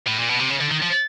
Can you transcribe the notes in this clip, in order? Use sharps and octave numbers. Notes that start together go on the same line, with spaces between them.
A2
A#2
B2
C3
C#3
D3
D#3
F3